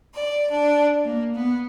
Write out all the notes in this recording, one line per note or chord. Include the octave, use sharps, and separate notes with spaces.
D5
D4
A#3
B3